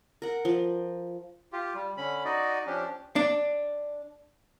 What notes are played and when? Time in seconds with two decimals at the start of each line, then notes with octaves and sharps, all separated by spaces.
0.22 A#4 F#5
0.45 F3
1.53 F4 G4
1.74 G3
1.97 D3 C#4 B5
2.25 D#4 F#4 D5 D#5
2.66 F3 C#4 D4 G4
3.16 D4